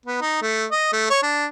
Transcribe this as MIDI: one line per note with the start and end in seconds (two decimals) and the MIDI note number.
0.06 0.21 59
0.21 0.37 63
0.42 0.65 57
0.71 0.92 75
0.93 1.10 57
1.10 1.20 73
1.23 1.46 62